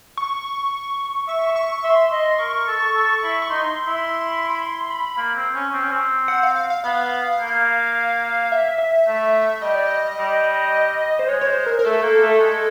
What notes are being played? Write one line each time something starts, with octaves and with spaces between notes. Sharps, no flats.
C#6
E5 C#6
C#6
E5 C6
D#5
A#4 C#6
A4
A4
E4
C#6
D#4 C6
E4
B5
C6
B5
A#3
C4
C#4
C4
C#4
C4
F#5
F5
F5
F5
B3 F5
A#3
E5
E5
A3
G3 D#5
D5
D#5
G3
C5
G#3 C#5
C#5
C5
A#4
A#4
A3 A4
A#3
A3
G#3